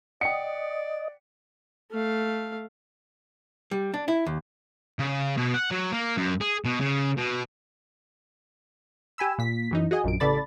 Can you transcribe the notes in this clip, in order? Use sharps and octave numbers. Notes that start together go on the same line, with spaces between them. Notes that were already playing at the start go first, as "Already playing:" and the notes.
D5 D#5 F#5 G5 C#7
A3 F5
G3
D4
E4
D#2
C#3
B2
F#5
F#3
A#3
F#2
G#4
B2
C#3
B2
G4 G#5 B5 E6
A#2 B6
F#2 E3 D#4
F#4 G#4 D#5 G#5
A#1 F#2 D7
A1 C#3 A4 D5 B5 A6